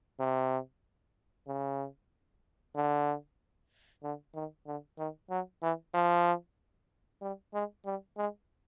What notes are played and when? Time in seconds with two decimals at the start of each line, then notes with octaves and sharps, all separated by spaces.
0.20 C3
1.47 C#3
2.76 D3
4.03 D3
4.35 D#3
4.66 D3
4.98 D#3
5.30 F#3
5.63 E3
5.94 F3
7.22 G3
7.54 G#3
7.86 G3
8.18 G#3